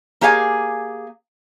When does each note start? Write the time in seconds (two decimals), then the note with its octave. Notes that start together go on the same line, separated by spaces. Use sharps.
0.21 A#3 G4 G#4 C#5 F5 G#5